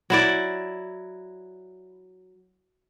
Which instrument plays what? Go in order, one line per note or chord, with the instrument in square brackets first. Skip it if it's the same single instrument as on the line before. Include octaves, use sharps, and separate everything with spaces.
[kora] F#3 E4 D5